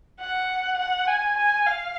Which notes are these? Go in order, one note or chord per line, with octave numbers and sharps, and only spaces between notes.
F#5
F#5
G#5
G#5
F5